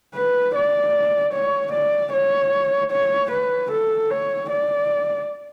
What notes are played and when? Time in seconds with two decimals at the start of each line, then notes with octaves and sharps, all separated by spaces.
0.15 B4
0.55 D5
1.33 C#5
1.73 D5
2.13 C#5
2.92 C#5
3.32 B4
3.71 A4
4.10 C#5
4.50 D5